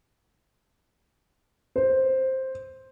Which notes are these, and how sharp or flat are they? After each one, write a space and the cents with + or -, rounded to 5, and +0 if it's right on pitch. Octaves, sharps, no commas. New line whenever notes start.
C5 +5